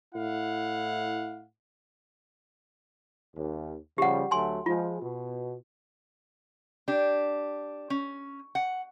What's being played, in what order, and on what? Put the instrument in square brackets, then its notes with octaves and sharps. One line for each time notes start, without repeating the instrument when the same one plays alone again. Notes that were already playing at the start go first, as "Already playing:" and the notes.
[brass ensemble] A2 E4 F5 F#5
[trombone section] D#2
[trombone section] C#3 F3 G3 [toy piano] G4 F#5
[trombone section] D2 F#3 A3 [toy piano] G#5 C6
[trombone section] F3 G#3 [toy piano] F4
[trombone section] B2
[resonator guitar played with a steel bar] D4 G4
C#4
F#5